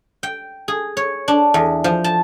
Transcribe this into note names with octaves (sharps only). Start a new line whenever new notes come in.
G5
G#4
C#5
D4
E2
F3
A5